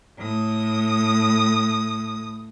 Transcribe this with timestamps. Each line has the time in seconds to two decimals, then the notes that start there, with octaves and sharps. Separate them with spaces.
0.18 A2 D#6